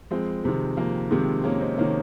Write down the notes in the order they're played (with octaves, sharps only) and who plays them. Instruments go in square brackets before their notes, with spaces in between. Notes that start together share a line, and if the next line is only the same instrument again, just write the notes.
[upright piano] F2 G#3 C4
C3 D#3 G#3
F2 A#3
C3 D#3 G#3 C4
F2 A#3 C#4
C4 D#4
C3 D#3 A#3 C#4